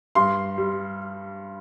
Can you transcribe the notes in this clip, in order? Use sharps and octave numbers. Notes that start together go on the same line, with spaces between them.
G2 C6
G3